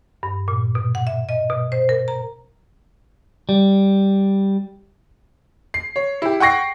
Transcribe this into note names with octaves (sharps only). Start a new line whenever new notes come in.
G2
A#2
B2
F#5
E5
D#5
B2
C5
A#4
A#5
G3
C7
C#5
E4 G4
F#5 G5 C#6 A#6 C7